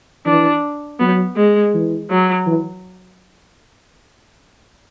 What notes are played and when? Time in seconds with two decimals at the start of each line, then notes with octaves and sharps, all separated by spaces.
0.26 E3 D4
0.99 F#3 B3
1.36 G#3
1.74 E3
2.10 F#3
2.47 E3